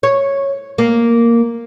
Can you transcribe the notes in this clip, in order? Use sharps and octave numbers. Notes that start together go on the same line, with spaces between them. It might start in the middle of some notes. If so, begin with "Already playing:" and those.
C#5
A#3